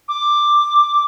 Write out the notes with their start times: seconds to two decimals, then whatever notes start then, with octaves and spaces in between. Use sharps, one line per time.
0.08 D6